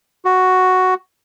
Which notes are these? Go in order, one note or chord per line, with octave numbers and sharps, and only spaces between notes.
F#4